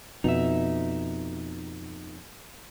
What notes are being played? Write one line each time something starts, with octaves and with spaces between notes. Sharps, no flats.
F2 B2 D#4 E5